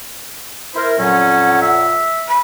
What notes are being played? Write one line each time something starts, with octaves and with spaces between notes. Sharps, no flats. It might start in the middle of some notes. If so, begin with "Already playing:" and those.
E4 A#4 C5
F2 A#2 F#3 C#4 F#5
E5
B5